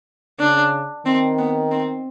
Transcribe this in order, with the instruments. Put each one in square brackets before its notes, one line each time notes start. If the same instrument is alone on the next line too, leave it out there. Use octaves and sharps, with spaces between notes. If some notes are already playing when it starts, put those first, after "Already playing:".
[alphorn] C#3 [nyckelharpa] D4
[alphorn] D#3 [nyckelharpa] C4
[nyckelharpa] B3
C4